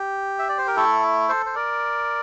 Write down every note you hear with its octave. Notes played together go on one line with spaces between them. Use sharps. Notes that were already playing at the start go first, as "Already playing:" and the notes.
Already playing: G4
E5
D5
C5
A#4
A3 E4 A4
A4 C5
C5
A#4 D5